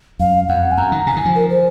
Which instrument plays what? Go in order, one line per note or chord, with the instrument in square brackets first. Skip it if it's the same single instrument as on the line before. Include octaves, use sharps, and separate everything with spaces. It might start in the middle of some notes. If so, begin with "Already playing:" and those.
[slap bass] F#2 [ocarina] F5
[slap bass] F2 [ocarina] F#5
[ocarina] G#5
[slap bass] F#2 [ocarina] A#5
[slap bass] D#3
[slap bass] C3 [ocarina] G#5
[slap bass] D#3
F3
[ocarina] A#4
C5